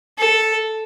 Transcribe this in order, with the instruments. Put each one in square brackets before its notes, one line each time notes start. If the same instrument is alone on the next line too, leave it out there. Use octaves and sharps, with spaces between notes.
[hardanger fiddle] A4